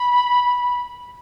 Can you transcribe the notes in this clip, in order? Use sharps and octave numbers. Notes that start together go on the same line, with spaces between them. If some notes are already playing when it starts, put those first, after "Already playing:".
Already playing: B5